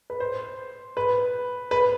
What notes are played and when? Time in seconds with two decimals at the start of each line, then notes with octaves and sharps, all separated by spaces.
0.10 B4
0.20 C5
0.97 B4
1.71 B4